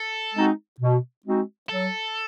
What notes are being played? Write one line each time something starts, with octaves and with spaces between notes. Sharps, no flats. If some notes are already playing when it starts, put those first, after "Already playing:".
Already playing: A4
G#3 C4 D#4 F#4
B2
G#3 C4 D#4 F#4
F#3 A4